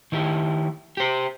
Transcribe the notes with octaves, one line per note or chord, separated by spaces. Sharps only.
D#3 E4 G4
G4 C5